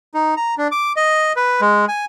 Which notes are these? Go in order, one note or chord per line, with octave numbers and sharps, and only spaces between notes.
D#4
A#5
D4
D6
D#5
B4
G#3
G#5